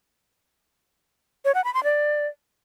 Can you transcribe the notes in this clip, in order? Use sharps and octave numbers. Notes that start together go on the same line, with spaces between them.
C#5
F#5
B5
C6
D5